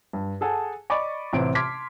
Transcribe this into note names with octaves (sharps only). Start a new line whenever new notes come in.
G2
G#4 A4 F#5 G#5 A5
D5 D#5 B5 C#6 D6 A6
A1 C3 E3 C4 D7
A5 C6 D6 F6 G#6 B6